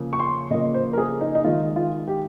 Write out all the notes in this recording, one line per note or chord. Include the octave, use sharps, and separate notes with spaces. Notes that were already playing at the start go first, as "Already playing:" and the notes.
Already playing: C#3 F3 A#3
C#6
C6
C#3 F3 A#3 D#5
C5
A#4
G#4
D#4
D#4
D#3 G#3 F4
F4
G4